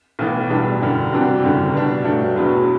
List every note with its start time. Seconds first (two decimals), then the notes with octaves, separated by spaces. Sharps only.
0.19 B1 A2 E3 B3
0.50 E1 E2 B2 G3 D4
0.81 F#2 D3 G3
1.12 C3 E3 G3 D4 F#4
1.42 F#1 F#2 D3 G3
1.73 B2 G3 D4
2.04 G2 F#3 A3 D4 G4
2.35 E1 E2 B2 F#3